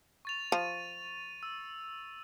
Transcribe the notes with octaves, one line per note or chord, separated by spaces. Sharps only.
C#6 A6 F7
F3 D#7
E6